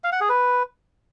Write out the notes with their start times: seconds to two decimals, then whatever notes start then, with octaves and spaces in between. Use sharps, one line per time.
0.04 F5
0.12 F#5
0.21 G#4
0.29 B4